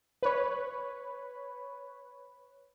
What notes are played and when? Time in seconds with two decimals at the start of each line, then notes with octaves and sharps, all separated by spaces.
0.23 B4 C#5